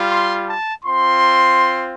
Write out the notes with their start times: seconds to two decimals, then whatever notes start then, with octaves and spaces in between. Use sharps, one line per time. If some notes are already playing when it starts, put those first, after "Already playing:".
Already playing: G3 F4
0.09 C6
0.47 A5
0.84 C4 F4 C6